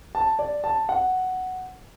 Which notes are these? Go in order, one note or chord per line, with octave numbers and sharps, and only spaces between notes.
A5
D5
A5
F#5